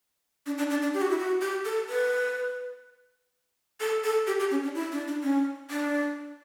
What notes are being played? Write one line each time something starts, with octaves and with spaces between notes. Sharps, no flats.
D4
D4
D4
D4
G4
F#4
E4
F#4
G4
A4
B4
A4
A4
G4
G4
C#4
D4
E4
D4
D4
C#4
D4